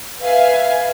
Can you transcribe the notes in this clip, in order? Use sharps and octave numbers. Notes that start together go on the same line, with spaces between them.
B4 E5 F5 G#5